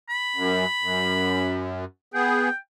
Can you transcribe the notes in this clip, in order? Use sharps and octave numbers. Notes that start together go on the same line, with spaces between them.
B5
F#2
F#2
B3 G#4 G5